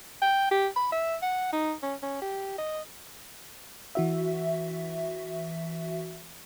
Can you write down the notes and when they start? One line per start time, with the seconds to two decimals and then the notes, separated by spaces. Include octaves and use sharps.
0.22 G5
0.51 G4
0.76 B5
0.92 E5
1.22 F#5
1.53 D#4
1.83 C#4
2.02 C#4
2.22 G4
2.58 D#5
3.95 E3 F#4 E5